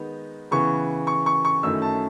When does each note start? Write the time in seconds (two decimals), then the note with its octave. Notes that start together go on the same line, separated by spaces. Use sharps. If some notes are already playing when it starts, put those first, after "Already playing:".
Already playing: D#3 G#3 B3 D#4
0.51 C#3 E3 B3 C#6
1.07 C#6
1.26 C#6
1.45 C#6
1.63 F#2 D#3 A3 C#4 E4 E6
1.82 A5